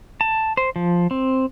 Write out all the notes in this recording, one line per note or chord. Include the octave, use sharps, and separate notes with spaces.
A5
C5
F3
C4